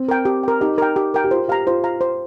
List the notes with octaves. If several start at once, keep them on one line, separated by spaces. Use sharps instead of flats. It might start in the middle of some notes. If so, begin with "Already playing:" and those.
Already playing: C4
A#4 G5
G4
A#4 G5
D#4 G4
A#4 G5
G4
A#4 G5
G4
F4 C5
G4 F5 A#5
F4 C5
F5 A#5
C5